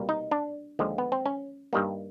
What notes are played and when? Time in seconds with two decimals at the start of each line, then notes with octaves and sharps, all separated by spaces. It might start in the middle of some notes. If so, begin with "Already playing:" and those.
Already playing: C2 B2 G3 A#3
0.09 D#4
0.31 D4
0.79 D#2 D3 F3 G#3
0.98 B3
1.12 C4
1.26 C#4
1.73 G2 D#3 G3 A#3